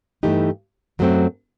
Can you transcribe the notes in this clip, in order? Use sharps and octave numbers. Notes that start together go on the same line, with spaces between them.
G2 E3 A3 D#4 G4
F#2 F#3 A3 C4